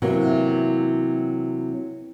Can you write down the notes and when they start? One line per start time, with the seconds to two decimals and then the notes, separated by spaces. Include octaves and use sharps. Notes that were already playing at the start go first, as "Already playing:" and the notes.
0.02 C3 E3 F#3 A#3